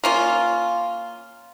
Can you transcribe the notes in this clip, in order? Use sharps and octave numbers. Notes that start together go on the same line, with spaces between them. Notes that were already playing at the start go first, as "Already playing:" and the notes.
A#3 C#4 F4